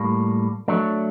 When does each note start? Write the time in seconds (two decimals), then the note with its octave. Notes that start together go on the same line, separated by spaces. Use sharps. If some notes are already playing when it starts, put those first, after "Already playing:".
Already playing: A2 G3 A#3
0.68 F#3 A3 D4